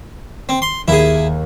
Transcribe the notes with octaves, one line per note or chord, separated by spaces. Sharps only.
C4
C6
D#2 E4 G#4